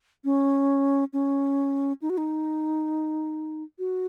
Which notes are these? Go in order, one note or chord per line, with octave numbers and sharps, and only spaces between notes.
C#4
C#4
D#4
F#4
D#4
F#4